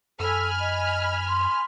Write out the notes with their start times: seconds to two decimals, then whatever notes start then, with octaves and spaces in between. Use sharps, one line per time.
0.20 F#2 A4 G#5 B5 F6
0.59 D#5
1.28 C6